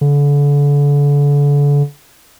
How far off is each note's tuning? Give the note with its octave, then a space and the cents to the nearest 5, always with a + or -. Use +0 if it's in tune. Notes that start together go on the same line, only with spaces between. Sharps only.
D3 -35